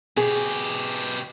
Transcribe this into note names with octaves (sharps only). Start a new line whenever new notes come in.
B2 G4 G#4